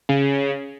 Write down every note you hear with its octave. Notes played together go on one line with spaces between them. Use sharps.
C#3